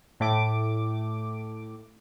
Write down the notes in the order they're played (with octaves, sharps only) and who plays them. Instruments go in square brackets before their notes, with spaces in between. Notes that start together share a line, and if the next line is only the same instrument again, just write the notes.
[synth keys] A2 A3 D6